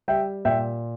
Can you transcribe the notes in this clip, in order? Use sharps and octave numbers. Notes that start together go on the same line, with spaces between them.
G3 E5 G5
A#2 E5 G5